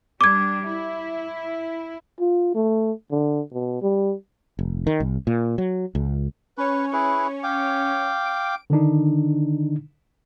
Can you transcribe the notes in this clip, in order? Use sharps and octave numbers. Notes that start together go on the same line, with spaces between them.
G3 D4 D6 G#6
E4
F4
A3
D3
B2
G3
F1
D#3
C2
A#2
F#3
C#2
C#4 B4 C#5
E4 G#4 B4
F5 G5 D6
D7
D3 D#3 D4 D#4